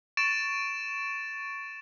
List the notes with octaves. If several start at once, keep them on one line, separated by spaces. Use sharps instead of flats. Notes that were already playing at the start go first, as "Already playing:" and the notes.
C#6 A6 D7 E7